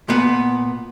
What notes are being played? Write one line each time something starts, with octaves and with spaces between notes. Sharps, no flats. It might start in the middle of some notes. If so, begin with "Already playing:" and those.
A#2 B3